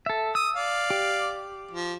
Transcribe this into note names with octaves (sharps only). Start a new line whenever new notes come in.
A4 E5
D#6 E6
D5 F5
G4
F3